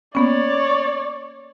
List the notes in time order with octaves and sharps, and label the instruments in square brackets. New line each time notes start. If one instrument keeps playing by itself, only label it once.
[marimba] A#3 B3 C#4 [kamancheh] C#5 D5